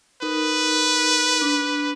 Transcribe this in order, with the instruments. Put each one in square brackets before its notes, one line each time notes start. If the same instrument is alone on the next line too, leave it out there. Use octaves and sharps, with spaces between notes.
[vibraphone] D#4 A#4 [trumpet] B4
[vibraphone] D4